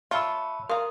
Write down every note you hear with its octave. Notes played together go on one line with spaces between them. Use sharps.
F4 B4 C#5 E5 A5 C6 E6
A#4 F5 A#5 C6 D#6